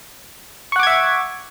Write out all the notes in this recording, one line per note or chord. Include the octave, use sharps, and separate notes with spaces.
E5 F#5 C#6 D6 G#6